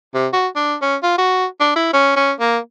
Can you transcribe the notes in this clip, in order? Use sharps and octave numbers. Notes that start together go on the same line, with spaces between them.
C3
F#4
D4
C#4
F4
F#4
D4
E4
C#4
C#4
A#3